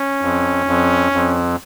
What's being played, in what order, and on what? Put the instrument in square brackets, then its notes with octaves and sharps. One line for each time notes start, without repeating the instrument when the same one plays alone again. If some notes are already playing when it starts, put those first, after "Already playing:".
Already playing: [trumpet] C#4
[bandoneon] F2
F2
F2